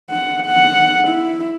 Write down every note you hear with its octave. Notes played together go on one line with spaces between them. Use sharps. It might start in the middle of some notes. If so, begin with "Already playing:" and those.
F#5
F#5
E4